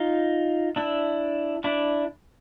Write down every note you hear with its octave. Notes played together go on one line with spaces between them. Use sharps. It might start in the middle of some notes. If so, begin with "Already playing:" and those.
Already playing: D#4 F4
D4 E4
D4 E4